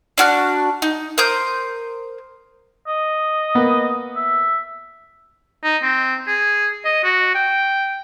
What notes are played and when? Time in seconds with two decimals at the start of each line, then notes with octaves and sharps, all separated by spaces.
0.18 D4 F#4 F6
0.82 D#4
1.18 A#4 C5 D#6 G6
2.87 D#5
3.55 A#3 B3
4.16 E5
5.64 D#4
5.83 C4
6.27 G#4
6.85 D#5
7.04 F#4
7.35 G5